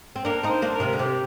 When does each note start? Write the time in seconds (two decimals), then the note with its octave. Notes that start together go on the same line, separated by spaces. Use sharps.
0.16 C4
0.25 A#3 D4 A#4
0.43 C4 D#4
0.50 C5
0.62 A#3 D4
0.75 A#4
0.80 C3 D#3
0.93 D3
0.99 C3 G4